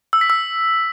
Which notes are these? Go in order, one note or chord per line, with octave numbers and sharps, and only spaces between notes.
E6
B6
E6